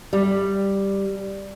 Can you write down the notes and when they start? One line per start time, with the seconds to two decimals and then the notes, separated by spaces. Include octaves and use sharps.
0.13 G3